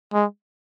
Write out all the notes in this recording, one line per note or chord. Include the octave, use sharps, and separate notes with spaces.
G#3